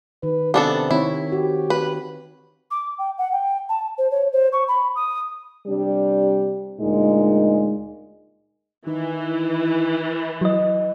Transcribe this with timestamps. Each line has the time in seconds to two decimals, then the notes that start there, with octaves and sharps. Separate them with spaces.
0.23 D#3 B4
0.54 C3 B3 D4 A4
0.91 D#3 C4 E4 C#5
1.32 F#4 G4
1.70 B4
2.71 D6
2.98 G5
3.18 F#5
3.32 G5
3.69 A5
3.98 C5
4.11 C#5
4.33 C5
4.52 C#6
4.68 B5
4.95 D#6
5.67 C3 G3 D4 G4
6.81 D2 A#2 G#3 D#4
8.87 D#3 E3
10.41 F#3 D#5